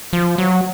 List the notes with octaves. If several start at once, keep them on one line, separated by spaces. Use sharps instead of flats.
F3
F#3